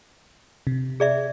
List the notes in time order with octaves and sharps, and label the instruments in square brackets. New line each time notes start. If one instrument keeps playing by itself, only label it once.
[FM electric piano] C3
[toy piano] G#4 D5 E5